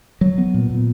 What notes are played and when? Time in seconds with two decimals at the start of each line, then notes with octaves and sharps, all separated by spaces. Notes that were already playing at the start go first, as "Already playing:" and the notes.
0.21 F#3
0.38 B3
0.54 A#2
0.70 A#2